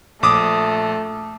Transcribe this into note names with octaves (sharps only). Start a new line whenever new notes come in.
A#1 A3 D6 D#6